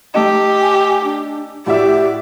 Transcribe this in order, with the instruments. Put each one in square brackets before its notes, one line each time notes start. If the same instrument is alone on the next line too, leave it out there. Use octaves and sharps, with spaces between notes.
[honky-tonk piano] A3 D#4 [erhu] G4
[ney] G#5
D4
[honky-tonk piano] A2 F#4 E5 [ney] G4 [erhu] D5